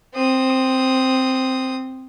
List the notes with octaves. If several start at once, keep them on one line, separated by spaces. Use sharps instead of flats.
C4 D#6